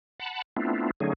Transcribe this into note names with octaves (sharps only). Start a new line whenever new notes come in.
F#5 A5 B5
A3 B3 C4 D4 E4 F4
D3 F#3 A3 C#4 D#4 G#4